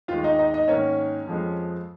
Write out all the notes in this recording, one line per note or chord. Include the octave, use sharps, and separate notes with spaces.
D#2 D#3 G#3 F4 F5
D#4 D#5
D#4 D#5
D#4 D#5
G#2 D#3 A#3 C#4 C#5
F2 F3 G#3